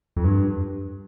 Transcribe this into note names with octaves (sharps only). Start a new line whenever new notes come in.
F2
G2